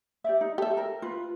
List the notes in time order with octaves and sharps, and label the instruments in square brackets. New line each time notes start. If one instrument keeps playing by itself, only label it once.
[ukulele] G4 D5 E5
D#4
[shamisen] G4 E5 [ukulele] A4
[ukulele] A#4
F4 B4